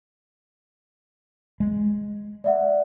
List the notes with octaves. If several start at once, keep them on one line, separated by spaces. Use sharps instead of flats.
G#3
D5 E5 F#5